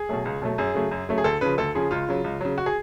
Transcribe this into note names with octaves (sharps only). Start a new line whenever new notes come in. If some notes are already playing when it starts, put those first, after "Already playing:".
Already playing: G#4
B2 F#3 A3
C#2
B2 F#3 A3
F#2 G#4
C#3 F#3 A3
F#2
C#3 F#3 A3
G#4
D2 A4
C#3 F3 B4
D2 A4
C#3 F3 G#4
C#2 F4
C#3 F#3
C#2
C#3 F#3
F#4
G#4